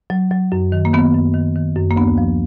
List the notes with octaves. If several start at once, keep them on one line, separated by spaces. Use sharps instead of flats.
F#3
F#3
F#2
D#3
A#3
D#3 B3
F#2
D#3
D#3
F#2
A#3
D2 B3
F3